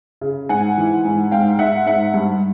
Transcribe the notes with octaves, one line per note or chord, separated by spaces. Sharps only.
C#3
G#2 F#5 G#5
E3
G#2
G#2 F5 G5
G#2 E5 F#5
G#2 E5 F#5
G2